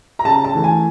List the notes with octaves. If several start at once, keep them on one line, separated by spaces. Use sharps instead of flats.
A#5
C#3 A5
A5
E3 A3
G#5